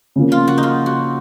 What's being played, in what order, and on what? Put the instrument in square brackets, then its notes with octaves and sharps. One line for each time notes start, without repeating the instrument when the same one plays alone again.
[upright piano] C#3 F3 A#3
[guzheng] F4
F#4
D#4
F4
F#4